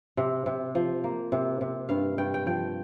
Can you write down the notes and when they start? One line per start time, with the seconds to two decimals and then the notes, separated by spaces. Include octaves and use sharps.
0.17 C3
0.46 C3
0.75 F3
1.04 A#3
1.32 C3
1.61 C3
1.89 G2 F5
2.18 G2 G5
2.34 G5
2.46 F3 G5